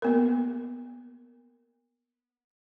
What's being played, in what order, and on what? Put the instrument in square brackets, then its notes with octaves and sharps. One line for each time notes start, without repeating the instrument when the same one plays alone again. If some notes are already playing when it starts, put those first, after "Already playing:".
[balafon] A#3 B3 A#4